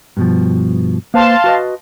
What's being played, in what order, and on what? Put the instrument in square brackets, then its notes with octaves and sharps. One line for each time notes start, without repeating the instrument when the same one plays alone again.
[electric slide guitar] G2 B2 F3
[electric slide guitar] A#3 B4 C5 [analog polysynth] F5 A5 C6
[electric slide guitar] F#4 B4 D#5